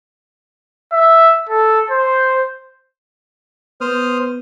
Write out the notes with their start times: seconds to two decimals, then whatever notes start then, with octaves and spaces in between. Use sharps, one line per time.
0.93 E5
1.50 A4
1.91 C5
3.81 B3 C5 D#6 F6